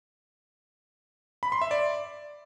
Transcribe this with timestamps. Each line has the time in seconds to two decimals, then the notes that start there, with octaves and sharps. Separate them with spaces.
1.43 B5
1.52 C6
1.61 E5
1.71 D5